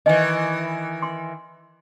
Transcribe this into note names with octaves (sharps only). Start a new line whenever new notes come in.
D#3 E3 D#5 G#5
C6